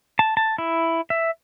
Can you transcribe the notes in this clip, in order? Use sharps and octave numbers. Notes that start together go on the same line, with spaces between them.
A5
A5
E4
E5